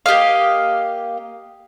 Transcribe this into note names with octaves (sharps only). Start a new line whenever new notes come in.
A#3 G4 D#5 F5